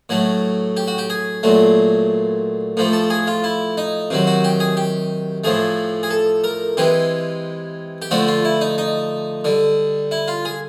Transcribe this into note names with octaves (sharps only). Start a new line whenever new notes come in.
A2 F#3 A3
G4
F#4
G4
G#4
A#2 F#3 A3
A2 F3 A3
A4
G#4
F4
E4
D#4
C3 D#3 F#3
F#4
G4
G#4
G4
A2 F3 A3 G#4
G#4
A4
A#4
C3 E3 G#3 G4
G4
D3 F3 A3 F#4
F4
E4
D#4
D#4
D3 G3
E4
F4
G#4